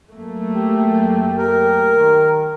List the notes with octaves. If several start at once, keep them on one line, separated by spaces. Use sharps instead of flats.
F#2 A3 A#3
G4
G4 A#4
D#3